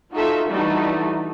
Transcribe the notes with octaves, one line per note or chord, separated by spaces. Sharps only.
D#4 F4 F#4 A4 E5
E3 G3 A3 D4 D#4 F#4